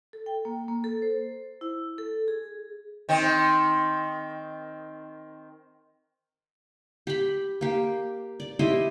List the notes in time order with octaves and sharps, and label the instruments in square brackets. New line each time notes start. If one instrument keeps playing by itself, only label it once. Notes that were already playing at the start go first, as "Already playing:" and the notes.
[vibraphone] A4
G5
A#3
A#3
A4
C5
E4
A4
G#4
[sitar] D#3 C4
[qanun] G4 B5
A#3 G4
D5
E4 G4 C5 D#5